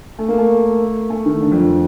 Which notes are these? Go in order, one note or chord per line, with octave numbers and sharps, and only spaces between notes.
A3
A#3
A3
A3
D#3
D3
F2
F2